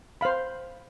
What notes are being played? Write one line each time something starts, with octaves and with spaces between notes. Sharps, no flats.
C5 F5 B5